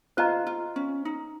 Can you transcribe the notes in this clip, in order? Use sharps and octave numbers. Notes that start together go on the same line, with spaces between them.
F4 C5 D#5 A#5
F4
C#4
D#4